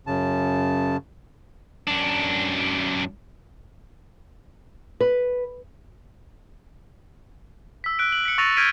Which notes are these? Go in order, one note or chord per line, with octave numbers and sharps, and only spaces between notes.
F#2 C#3 A5
F#2 D4
B4
E6 B6
F#6 D7
F#7
B6 C#7
C#6 E6 A6 A#6 D#7 F7
F6 G6 G#6 B6 D7 D#7